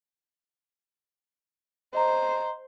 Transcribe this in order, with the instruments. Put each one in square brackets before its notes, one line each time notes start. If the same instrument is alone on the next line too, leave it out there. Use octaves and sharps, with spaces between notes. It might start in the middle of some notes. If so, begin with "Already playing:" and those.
[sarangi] C5 [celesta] D#5 A#5